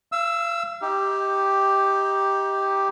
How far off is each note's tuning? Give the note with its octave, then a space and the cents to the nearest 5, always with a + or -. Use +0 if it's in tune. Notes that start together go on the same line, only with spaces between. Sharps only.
F5 -40 E6 +0
D#4 +25 G4 +0